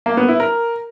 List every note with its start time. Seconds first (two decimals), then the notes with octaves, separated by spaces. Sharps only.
0.06 A#3
0.17 B3
0.28 E4
0.40 A#4